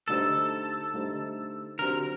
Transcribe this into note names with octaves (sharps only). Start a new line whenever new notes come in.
D3 A3 D#4 G4 A4 C5
D3 A3 D#4 G4 C5
D3 F#3 C4 G4 A#4 C5